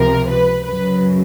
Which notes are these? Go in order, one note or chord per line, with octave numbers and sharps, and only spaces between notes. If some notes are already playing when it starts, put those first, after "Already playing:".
Already playing: C#2 C3 F3 A#4
B4
F#2 C#3 F#3 B4